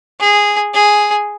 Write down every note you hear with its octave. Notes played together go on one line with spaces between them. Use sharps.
G#4
G#4